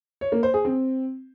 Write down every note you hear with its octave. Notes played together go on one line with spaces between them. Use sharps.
C#5
A#3
C5
G#4
C4